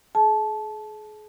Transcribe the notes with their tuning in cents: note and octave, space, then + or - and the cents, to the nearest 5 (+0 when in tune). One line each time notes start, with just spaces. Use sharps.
G#4 +35 A5 -20